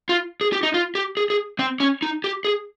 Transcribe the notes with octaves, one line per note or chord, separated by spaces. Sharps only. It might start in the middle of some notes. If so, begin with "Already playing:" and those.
F4
G#4
G4
D#4
F4
G4
G#4
G#4
C4
C#4
D#4
G4
G#4